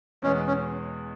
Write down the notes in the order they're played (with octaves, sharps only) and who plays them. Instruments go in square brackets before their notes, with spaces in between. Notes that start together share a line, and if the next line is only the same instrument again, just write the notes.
[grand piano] E2 B2 G#3 B3 [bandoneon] C#4
[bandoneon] C#4